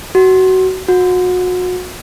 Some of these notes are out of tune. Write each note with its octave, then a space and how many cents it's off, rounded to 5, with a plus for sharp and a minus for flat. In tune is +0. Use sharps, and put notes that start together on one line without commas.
F#4 +20
F#4 -30